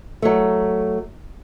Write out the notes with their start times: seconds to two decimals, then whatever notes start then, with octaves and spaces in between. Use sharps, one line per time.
0.22 F#3 A3